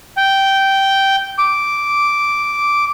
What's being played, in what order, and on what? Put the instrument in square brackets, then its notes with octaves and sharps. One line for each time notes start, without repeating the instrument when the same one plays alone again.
[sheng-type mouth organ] G5
D6